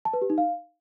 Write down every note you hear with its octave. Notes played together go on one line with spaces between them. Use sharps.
A5
B4
G4
D#4
F5